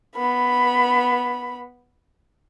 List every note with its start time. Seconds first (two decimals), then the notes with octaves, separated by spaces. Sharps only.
0.16 B3 B5